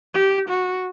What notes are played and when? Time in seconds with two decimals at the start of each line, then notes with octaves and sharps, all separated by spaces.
0.14 G4
0.49 F#4